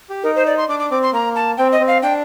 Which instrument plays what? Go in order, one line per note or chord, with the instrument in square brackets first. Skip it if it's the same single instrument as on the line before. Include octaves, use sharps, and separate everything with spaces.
[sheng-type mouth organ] G4
[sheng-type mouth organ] D#4 [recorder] A#4
[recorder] C5
D5
C6
[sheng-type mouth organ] D4 [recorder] D6
[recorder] D6
[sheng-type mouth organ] C4 [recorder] D6
[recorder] C6
[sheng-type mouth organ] A#3 [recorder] A#5
[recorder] A5
[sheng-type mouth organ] C4 [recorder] G5
[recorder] D#5
[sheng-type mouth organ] C4
[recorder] F5
[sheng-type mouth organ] D4 [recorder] G5